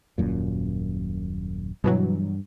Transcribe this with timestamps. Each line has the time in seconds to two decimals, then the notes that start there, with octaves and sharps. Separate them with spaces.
0.18 D#1 F#2 A#2
1.84 G2 B2 E3 F#3